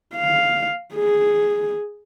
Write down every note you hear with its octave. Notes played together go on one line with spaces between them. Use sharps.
F5
G#4